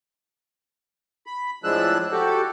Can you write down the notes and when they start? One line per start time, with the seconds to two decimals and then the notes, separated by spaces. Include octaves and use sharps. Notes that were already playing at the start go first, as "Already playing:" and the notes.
1.26 B5
1.64 A2 F3 G#3 D4 E6 F#6
2.12 F#4 G4 A4